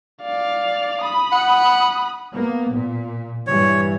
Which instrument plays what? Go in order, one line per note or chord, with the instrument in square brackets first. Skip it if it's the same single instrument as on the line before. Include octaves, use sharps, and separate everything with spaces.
[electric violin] D5 F5
B5 D#6
[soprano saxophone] F#5
[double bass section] A#3 B3
A#2
[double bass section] G2 E3 G3 [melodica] C#5